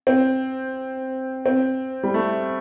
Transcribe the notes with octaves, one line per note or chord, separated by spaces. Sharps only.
C4
C4
G3
A3